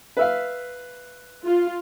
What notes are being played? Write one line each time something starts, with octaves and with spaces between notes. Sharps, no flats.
B4 E5 F5
F4